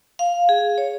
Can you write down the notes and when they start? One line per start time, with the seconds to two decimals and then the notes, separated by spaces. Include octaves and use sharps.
0.19 F5
0.49 G#4
0.78 C#5